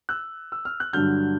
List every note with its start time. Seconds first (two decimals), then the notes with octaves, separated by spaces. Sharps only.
0.09 E6 F#6
0.52 E6
0.65 F6
0.80 F#6
0.93 G2 D3 F#3 F6 G6